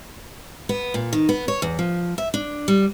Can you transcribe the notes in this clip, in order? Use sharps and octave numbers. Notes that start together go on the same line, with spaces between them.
B3
A#2
D#3
B3
C#5
E2
F3
E5
D4
G3